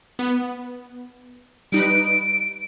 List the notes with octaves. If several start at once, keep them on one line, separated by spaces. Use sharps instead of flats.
B3
G3 D#4 B4 D7